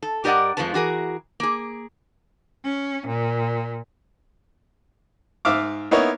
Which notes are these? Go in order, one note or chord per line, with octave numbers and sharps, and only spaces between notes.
A4
G2 G4 A#4 D5 D#5 F#5
F2 F3 G#3 A3 B4 A5
E3 F#4 G#4 A#4
A#3 G#4
C#4
A#2
G#2 E5 F5 D6
A#3 B3 D#4 E4 A#4 C#5